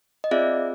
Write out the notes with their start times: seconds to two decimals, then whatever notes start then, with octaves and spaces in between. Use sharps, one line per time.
0.24 D#5
0.31 C4 F4 G#4 D5 E5